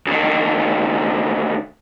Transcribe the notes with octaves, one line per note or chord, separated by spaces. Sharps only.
D2 D#3